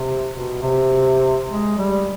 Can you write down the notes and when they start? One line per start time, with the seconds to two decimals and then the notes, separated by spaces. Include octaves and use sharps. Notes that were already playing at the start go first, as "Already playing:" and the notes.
Already playing: C3
0.33 B2
0.62 C3
1.49 G#3
1.78 G3